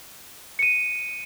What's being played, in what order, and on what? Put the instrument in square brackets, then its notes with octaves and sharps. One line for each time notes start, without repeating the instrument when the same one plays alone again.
[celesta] C#7 D#7